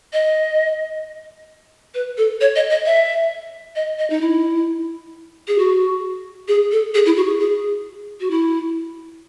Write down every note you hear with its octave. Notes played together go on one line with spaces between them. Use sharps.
D#5
B4
A4
C#5
D#5
D#5
E5
D#5
D#5
D#4
E4
G#4
F#4
G#4
A4
G#4
E4
F#4
G#4
G#4
F#4
E4